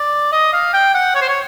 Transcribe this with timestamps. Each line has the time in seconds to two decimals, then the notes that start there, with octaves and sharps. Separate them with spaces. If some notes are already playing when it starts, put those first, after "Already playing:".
Already playing: D5
0.32 D#5
0.53 F5
0.74 G5
0.94 F#5
1.15 C#5
1.22 C5
1.28 C#5